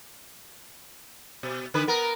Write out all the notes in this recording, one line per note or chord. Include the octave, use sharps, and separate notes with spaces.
B2
D3 B4
B3 A#4